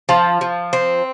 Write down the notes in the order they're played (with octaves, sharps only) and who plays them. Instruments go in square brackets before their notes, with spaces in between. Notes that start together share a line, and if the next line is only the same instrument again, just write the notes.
[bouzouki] F3 [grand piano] A5 C6
[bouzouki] F3
C4